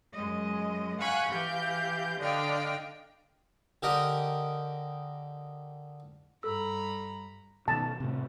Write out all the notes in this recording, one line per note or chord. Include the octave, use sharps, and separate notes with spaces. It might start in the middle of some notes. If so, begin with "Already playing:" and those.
F#2 G#3 D#5
F5 F#5 G#5 B5 C#6 F#6
E3 G4 F5 G6
D3 D4 D#5 F5 G5 F6
D3 G4 A#4 D#5
G2 A4 A#5 B5 E6
B2 D#3 A5
A2 C3